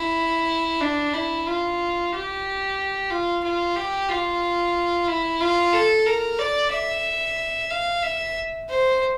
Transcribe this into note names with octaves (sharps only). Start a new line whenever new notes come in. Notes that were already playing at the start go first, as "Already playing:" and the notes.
Already playing: E4
D4
E4
F4
G4
F4
F4
G4
F4
E4
F4
A4
A#4
D5
E5
F5
E5
C5